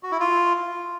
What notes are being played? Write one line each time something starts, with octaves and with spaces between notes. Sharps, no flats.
F#4
E4
F4